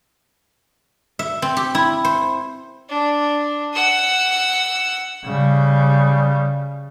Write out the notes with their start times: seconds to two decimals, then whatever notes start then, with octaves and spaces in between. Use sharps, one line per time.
1.19 E5
1.42 C4
1.57 G4
1.75 E4
2.05 C5
2.89 D4
3.74 F#5 E6
5.26 C#3 G3